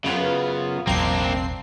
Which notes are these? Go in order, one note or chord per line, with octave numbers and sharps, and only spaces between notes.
F#2 C#3 B3 F4
E1 A1 F#3 A#3 C4 D4 C7